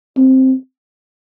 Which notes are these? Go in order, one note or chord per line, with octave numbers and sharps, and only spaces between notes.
C4